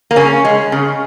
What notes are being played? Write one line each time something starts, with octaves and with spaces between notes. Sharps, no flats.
A#3
C#3 C#4
G#3
C#3